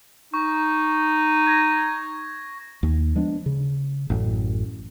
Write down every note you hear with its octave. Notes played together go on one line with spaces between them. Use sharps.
D#4 C#6
G#6 A#6
D#2
F3 G#3 B3 D4
C#3
A1 F#2 A2